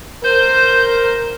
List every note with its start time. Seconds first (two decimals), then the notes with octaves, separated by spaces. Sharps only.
0.24 A#4 C5 G6